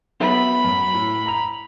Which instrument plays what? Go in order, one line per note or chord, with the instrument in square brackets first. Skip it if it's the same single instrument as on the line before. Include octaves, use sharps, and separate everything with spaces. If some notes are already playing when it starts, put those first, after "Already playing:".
[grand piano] F#3 B3 E5 [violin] B5
[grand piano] F#2
A2
A#5 F7